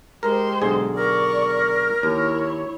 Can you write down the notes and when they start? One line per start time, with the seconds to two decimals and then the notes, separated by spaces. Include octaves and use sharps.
0.23 G#3 G4 A#4 C5
0.62 B1 D3 G#4
0.95 A#4 D5 C#6
2.03 D#2 E4 C#5